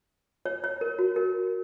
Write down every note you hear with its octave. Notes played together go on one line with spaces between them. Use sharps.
C#5
C#5
A#4
F#4
A#4